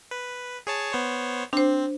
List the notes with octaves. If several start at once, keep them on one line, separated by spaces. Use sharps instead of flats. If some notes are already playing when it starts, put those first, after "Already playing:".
B4
G#4 C#5 A5
B3 C5 C#5
C4 D4 C5